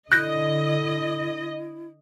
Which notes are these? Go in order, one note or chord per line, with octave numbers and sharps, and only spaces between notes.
D3 E4 D#5 F#6 G6 A#6